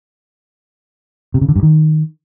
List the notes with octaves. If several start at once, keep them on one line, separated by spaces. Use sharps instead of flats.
C3
C#3
D3
G2
D#3